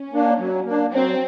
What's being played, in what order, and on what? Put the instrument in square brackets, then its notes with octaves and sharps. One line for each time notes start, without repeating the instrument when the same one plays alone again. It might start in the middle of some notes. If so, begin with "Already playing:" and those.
Already playing: [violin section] C#4
[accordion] A#3 D4
F#3
A#3 D4
[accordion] F#3 [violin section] C4